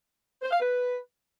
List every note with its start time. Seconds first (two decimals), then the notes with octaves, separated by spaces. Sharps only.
0.42 C5
0.51 F5
0.60 B4